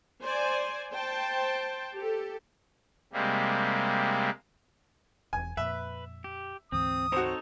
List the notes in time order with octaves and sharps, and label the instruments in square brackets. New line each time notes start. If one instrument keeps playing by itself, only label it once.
[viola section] C5 D5 G#5
C5 G5 A5
G4 A4
[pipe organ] C3 G3 G#3 A#3
[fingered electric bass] E1 E2 [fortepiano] G#5
[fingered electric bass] F2 A#2 [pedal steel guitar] B4 [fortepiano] E5
[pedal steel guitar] G4
[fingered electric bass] D2 G#2 E3 [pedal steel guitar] C4 [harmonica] D#6
[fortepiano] C4 F#4 [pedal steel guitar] D#4 A4 C#5